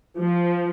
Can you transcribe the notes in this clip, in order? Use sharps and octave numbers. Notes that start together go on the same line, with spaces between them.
F3